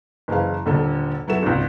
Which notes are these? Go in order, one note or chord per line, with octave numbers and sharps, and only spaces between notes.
F#1 E3 G#4 F5
D#1 D3 A4
F#3 B3 E4 F#4 A4 E7
G#1 C#2